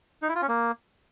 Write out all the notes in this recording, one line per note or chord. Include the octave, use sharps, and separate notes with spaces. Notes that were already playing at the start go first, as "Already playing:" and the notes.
D#4
E4
F4
C#4
A#3